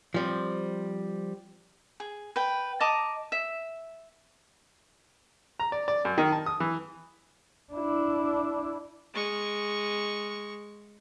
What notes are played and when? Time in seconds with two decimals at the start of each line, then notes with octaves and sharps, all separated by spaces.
0.14 F3 G3 C4
2.00 G#4
2.36 B4 G5
2.80 D#5 A5 A#5 D6
3.32 E5
5.60 A#5
5.72 D5
5.88 D5
6.05 F#2
6.18 D#3
6.32 A5
6.46 D#6
6.60 E3
7.73 D4 E4
9.14 G#3 C#6